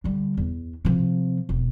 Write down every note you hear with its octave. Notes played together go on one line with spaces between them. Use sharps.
D3 G3
E2
C3 F3
E1